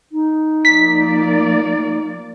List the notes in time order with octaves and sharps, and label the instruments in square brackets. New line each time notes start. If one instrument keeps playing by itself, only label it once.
[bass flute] D#4
[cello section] F3 A#3 D5 [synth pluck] B6